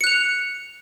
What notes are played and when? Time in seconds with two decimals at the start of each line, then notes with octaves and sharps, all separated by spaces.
0.01 C#7
0.04 F#6
0.07 F7